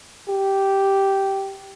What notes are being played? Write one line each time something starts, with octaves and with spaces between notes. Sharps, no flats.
G4